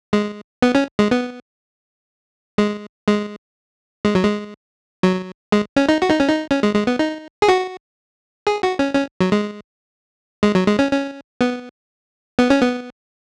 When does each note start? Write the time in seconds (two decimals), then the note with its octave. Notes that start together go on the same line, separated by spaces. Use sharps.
0.13 G#3
0.62 B3
0.75 C#4
0.99 G#3
1.11 B3
2.58 G#3
3.07 G#3
4.05 G#3
4.15 F#3
4.24 G#3
5.03 F#3
5.52 G#3
5.76 C#4
5.89 D#4
6.02 F#4
6.10 D#4
6.20 C#4
6.29 D#4
6.51 C#4
6.63 G#3
6.75 G#3
6.87 B3
6.99 D#4
7.42 G#4
7.48 F#4
8.47 G#4
8.63 F#4
8.79 C#4
8.95 C#4
9.21 F#3
9.32 G#3
10.43 G#3
10.55 F#3
10.67 G#3
10.79 C#4
10.91 C#4
11.41 B3
12.39 B3
12.50 C#4
12.61 B3